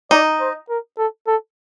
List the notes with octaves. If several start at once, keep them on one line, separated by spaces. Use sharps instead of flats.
D#4 D5
C5
A#4
A4
A4